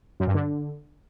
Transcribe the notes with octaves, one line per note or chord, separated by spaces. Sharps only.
F#2
G2
D3